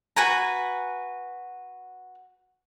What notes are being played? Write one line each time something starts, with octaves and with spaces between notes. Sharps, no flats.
F#4 B4 G#5 A#5